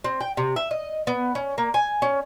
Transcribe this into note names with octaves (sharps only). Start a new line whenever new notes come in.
C4
G5
C3
E5
D#5
B3
C#4
A#3
G#5
C#4